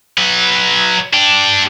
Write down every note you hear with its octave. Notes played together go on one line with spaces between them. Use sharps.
F#3 B4
D4 G4